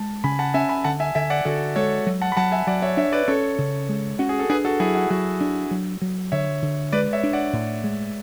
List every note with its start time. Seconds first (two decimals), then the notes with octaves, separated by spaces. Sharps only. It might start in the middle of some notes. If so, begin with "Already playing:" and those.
Already playing: G#3 A5
0.24 C#3 G#5 B5
0.39 F#5 A5
0.54 C#4 E5 G#5
0.69 G#5 B5
0.84 D3 F#5 A5
1.00 E5 G#5
1.15 D3 E5 G#5
1.30 D5 F#5
1.45 D3 F#4 A4
1.76 G#3 A4 C#5
2.07 F#3
2.22 F#5 A5
2.32 B5
2.37 F#3 F#5 A5
2.52 E5 G#5
2.67 F#3 D5 F#5
2.82 C#5 E5
2.97 D4 C#5 E5
3.12 B4 D5
3.28 C#4 A4 C#5
3.58 C#3
3.89 G#3
4.19 C#4 F#4
4.29 G#4
4.39 A4
4.49 D4 G#4 B4
4.65 F#4 A4
4.80 F#3 E4 G#4
4.95 F#4
5.10 F#3 F#4
5.41 D4
5.71 F#3
6.02 F#3
6.32 D3 C#5 E5
6.62 D3
6.92 G#3 B4 D5
7.13 C#5 E5
7.23 D4
7.33 D5 F#5
7.53 A2
7.84 G#3